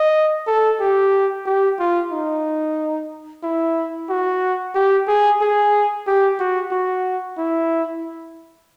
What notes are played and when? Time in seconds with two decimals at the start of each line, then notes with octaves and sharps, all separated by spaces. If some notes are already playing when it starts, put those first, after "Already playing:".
Already playing: D#5
0.47 A4
0.80 G4
1.46 G4
1.79 F4
2.12 D#4
3.43 E4
4.10 F#4
4.75 G4
5.08 G#4
5.41 G#4
6.07 G4
6.40 F#4
6.72 F#4
7.38 E4